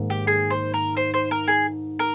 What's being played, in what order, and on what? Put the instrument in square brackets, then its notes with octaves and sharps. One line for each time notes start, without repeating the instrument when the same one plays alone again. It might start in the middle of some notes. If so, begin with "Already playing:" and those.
Already playing: [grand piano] G#2 D#3 A#3
[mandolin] G4
G#4
C5
A#4
C5
C5
A#4
G#4
A#4